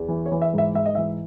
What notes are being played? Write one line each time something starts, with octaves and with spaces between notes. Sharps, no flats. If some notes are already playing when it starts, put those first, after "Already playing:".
Already playing: E2
E3
C#5
E3
E5
G#2 E5
G#2 E5
D#5
E3 E5